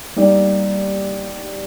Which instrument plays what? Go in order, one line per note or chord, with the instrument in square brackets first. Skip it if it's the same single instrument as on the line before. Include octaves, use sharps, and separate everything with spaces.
[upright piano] G3 A#3 D#4 G4 D5